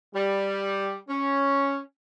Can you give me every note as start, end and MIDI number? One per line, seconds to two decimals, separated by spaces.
0.13 0.94 55
1.08 1.77 61